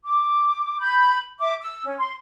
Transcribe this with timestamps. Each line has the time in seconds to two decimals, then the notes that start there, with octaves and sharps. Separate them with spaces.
0.04 D6
0.80 B5 G6
1.39 E5 D6
1.61 E6
1.84 C#4
1.97 C6